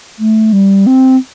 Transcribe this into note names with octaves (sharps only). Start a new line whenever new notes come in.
A3
G3
C4